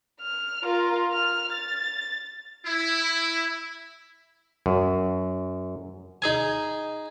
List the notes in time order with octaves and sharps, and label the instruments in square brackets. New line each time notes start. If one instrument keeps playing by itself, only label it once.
[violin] F6
F4 A#4
F6
A6
[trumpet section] E4
[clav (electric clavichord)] F#2
[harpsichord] D#4 G#4 G#5